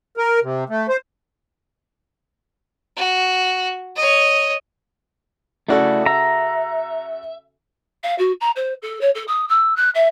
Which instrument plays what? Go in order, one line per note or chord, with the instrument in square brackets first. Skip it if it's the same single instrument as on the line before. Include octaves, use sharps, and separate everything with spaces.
[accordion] A#4
C3
A3
C5
[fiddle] F#4
C#5 D#5
[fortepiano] C#3 F#4 A4 [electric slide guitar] A3 E4 D5
[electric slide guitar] E5 [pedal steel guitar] A#5
[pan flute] F5
F#4
A#5
C5
A4
C#5
A4
D#6
E6
F#6
E5